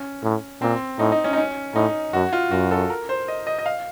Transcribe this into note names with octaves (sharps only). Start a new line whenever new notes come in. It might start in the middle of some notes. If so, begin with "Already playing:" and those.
Already playing: C#4
A2
A#2 C4
A2 D#4
D#4
C#4
D#4
C#4
A2 D#4
F#2 F#4
F4
F#2 F#4
A4
A#4
C5
D#5
D#5
D#5
F5